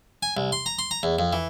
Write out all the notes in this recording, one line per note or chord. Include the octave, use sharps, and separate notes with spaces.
G#5
C2
C6
A#5
C6
A#5
E2
F2
E3